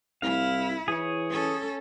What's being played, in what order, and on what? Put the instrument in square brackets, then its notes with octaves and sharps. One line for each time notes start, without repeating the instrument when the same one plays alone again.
[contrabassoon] C2 [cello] E4 [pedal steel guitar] F5
[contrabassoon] E3 [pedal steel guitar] G#4 C#5
[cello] C#4 A4